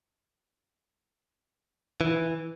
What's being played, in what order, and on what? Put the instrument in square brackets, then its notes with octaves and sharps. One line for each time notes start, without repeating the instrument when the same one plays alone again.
[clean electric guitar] E3